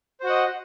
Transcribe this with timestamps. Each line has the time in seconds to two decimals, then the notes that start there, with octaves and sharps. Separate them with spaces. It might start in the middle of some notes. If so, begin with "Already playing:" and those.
0.20 C5
0.23 F#4
0.26 F#5
0.29 D#5